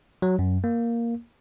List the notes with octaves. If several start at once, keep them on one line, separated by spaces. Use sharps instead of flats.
F#3
F#2
A#3